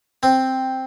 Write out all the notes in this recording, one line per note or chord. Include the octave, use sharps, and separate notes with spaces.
C4